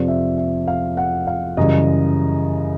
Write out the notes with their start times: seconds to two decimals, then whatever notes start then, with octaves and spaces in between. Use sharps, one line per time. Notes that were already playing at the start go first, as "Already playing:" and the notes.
Already playing: F2 C3 F3 D5
0.08 E5
0.38 E5
0.68 F5
0.97 F#5
1.27 F5
1.57 F#2 C#3 E3 G3 D#5